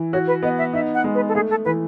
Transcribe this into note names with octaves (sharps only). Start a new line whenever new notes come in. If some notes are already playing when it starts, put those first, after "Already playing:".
Already playing: E3
F#4 C#5
B4
B3 D#5
E5
D#4 E5
F#5
G#3
B4
A4
A3 G#4
A4
E3 B4